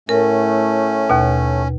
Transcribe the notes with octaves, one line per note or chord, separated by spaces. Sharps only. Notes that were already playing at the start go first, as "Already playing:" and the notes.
A2 A3 C#4 A#4
D#2 B2